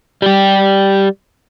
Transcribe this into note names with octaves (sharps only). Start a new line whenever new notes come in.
G3 G4